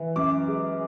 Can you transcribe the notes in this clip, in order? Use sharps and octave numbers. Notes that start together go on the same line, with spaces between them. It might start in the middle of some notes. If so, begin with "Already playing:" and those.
Already playing: E3
F#2 D6
G#3